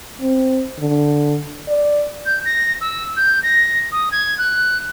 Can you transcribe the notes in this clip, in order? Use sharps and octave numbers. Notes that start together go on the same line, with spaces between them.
C4
D3
D5
G6
A#6
E6
G6
A#6
D#6
G#6
F#6